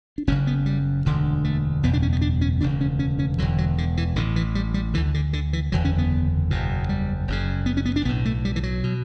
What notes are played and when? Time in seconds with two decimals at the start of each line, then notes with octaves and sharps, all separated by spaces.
0.18 D4
0.27 F#1 F#2 C#3 C#4
0.47 B3
0.66 G3
1.05 E1 D2 D3
1.44 A3
1.83 F#1 E2 B2 B3
1.93 D4
2.02 C#4
2.13 B3
2.21 D4
2.41 C#4
2.61 E1 D2 C#3 D4
2.81 C#4
2.99 C#4
3.19 C#4
3.38 E1 E2 D3 F#3
3.58 F#3
3.78 D3
3.97 E3
4.16 A1 A2 D3
4.36 E3
4.55 G3
4.74 G3
4.94 D2 D3 E3
5.14 D3
5.33 D3
5.53 E3
5.72 F#1 E2 D3 F#3
5.85 C#4
5.98 B3
6.50 F#1 E2 B2
6.89 G3
7.28 F#1 F#2 C#3
7.66 B3
7.77 C#4
7.85 B3
7.96 D4
8.05 B1 B3
8.09 A2
8.25 A3
8.45 G3
8.56 E3
8.63 F#3
8.84 B2